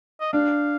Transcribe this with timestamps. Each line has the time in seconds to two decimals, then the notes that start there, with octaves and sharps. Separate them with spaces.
0.21 D#5
0.33 D4 F5